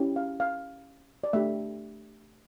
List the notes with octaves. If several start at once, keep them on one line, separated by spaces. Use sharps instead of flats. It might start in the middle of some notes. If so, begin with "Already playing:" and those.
Already playing: C#4 E4 G4
F5
F5
D5
A3 D4 G4 E5